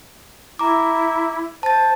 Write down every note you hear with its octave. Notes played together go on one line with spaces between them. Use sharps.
E4 A#5 D6
C5 A5 A6